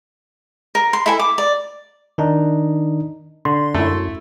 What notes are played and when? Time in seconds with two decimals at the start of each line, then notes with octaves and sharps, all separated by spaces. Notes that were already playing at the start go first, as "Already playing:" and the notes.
0.75 A#4
0.93 C6
1.06 E4 A4 E5 G#5
1.19 D6
1.38 D5
2.18 D#3 D4 D#4
3.45 D3 C6
3.74 F#2 A3 E4